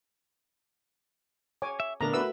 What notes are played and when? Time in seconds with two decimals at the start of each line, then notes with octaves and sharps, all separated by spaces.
1.62 C#5 G#5 D6
1.80 E5
2.01 A#2 D3 A3 B3 D4 A#4 A#5
2.13 A3 F#4 B4 E5 E6